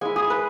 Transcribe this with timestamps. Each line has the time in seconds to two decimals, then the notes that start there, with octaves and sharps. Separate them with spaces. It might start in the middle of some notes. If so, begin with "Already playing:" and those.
0.01 G#3 E4 G#5
0.16 G#4
0.30 B4